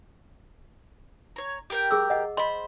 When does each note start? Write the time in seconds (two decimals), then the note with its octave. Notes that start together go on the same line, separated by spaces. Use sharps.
1.36 C#5 A#5
1.70 G4 A#4 G5
1.91 G#4 D6 E6
2.10 D#5 F#5
2.37 C5 D#5 B5 C6